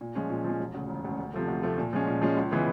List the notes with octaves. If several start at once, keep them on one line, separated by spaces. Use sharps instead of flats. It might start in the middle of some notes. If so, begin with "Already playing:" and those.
A#2
F3 G#3 C#4
A#2
F3 G#3 C#4
E1
D2 C#3
E1
D2 C#3
D2
C3 F3 A3
D2
C3 F3 A3
A#2
F3 G#3 C#4
A#2
F3 G#3 C#4
C#2
C#3 E3 G#3 B3